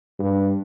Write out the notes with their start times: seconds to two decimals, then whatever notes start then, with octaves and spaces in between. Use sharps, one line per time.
0.19 G2